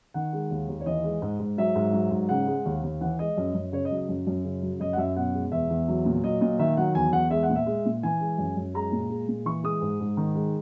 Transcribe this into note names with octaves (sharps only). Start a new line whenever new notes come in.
D#3 F#5
G#3
D#2
D#2
C#5
E3 D#5
G#3
G#2
G#2
F#3 E5
G#2
F#3
G#2
C#3 F#5
G#3
D#2
D#2
E3 F#5
G#3 D#5
F#2
F#2
C#3 C#5
D#5
F#3
D#5
F#2
F#2
C#3
F#3
F#2 D#5
F#5
F#2 E5
B2 F#5
G#3
E2 E5
E2
F#3
A#2
F#3 D#5
A#2 D#5
D#3 E5
F#3 F#5
E2 G#5
E2 F#5
G#3 E5
F#5
A#2
E5
G#3
A#2
E3 G#5
G#3
F#2
F#2
G#3 A#5
A#2
G#3
A#2
E3 C#6
G#3 D#6
G#2
G#2
D#3
G#3